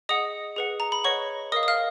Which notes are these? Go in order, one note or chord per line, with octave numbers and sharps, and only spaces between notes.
G#4 D#5 F#5 D#6
G#4 B4 F#5
A#5
B5
B4 C#5 D#5 F#5 C#6
A#4 D#5 F5 D#6
D#6
F5 F6